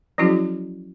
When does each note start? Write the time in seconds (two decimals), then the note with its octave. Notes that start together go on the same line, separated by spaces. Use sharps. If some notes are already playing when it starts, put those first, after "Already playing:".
0.18 F3 F#3 C#4 E4 F#4 G#4